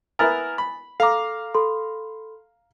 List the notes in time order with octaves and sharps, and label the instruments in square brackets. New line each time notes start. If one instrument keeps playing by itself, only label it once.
[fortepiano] B3 E4 A#4 [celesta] G#5 D#6 A6
[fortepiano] B5
[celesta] A4 D6 [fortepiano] F5 A#5
[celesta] A4 B5 C6